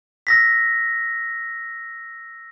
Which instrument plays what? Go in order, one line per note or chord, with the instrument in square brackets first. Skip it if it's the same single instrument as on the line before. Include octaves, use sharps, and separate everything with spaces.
[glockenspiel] E6 A#6 B6